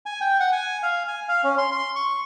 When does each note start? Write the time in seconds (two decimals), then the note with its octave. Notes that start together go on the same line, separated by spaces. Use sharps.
0.06 G#5
0.21 G5
0.40 F#5
0.53 G#5
0.83 F5
1.08 G#5
1.28 F5
1.44 C#4
1.58 C6
1.72 C6
1.96 C#6